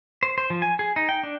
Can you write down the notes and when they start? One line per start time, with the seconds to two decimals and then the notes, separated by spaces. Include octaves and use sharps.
0.23 C5
0.38 C5
0.50 F3
0.62 G#5
0.79 G#4
0.96 D#4
1.09 G5
1.23 D4